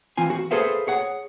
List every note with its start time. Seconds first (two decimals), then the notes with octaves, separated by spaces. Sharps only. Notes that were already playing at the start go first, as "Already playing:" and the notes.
0.17 E3 C4 F4 G#5
0.30 F#4
0.51 G#4 A4 B4 C5 E5 F5
0.87 G#4 C#5 F#5